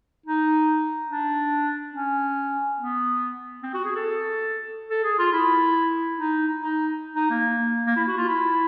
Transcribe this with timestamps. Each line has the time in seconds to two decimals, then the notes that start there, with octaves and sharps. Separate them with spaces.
0.26 D#4
1.09 D4
1.94 C#4
2.79 B3
3.63 C4
3.74 F#4
3.85 G#4
3.95 A4
4.90 A4
5.04 G#4
5.19 F4
5.33 E4
6.17 D#4
6.60 D#4
7.16 D#4
7.30 A#3
7.87 A#3
7.96 E4
8.08 F#4
8.17 F4
8.28 E4